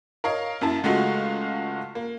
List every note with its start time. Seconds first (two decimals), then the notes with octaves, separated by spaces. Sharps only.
0.24 A#4 C#5 D#5 F5
0.61 F#2 A#3 E4 A5
0.83 C#2 G#3 A3 F4 F#4 F5
1.95 A#3